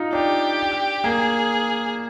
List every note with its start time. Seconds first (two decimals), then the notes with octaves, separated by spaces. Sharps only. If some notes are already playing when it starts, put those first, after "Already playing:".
Already playing: D#4 F4
0.13 D4 G4
1.04 A#3 G#4